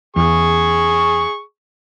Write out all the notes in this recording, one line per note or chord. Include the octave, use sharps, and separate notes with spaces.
E2 G#4 C#6